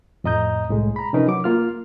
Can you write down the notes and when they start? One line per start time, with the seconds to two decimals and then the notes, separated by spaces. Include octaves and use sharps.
0.24 F2 A2 D#5 A#5 D#6 G6
0.69 C2 A2 G#3
0.96 A#5 B5
1.13 C3 F3 C#4 D#4 A#4 B4
1.28 F#3 D6
1.44 A#3 F4 F6